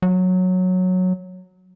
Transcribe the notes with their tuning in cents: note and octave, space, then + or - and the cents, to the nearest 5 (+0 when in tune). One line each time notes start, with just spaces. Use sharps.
F#3 -10